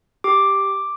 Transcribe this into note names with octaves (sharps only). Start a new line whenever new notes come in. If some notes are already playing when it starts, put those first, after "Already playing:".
G4 D6